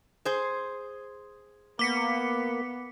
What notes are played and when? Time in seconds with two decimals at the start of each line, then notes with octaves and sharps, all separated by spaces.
0.25 G#4 C5
1.79 A#3 B3 D6 B6 C#7